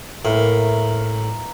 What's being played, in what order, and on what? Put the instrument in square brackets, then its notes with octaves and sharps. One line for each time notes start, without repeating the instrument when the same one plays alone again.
[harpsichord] A2 [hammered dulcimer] E3 A#3 A#4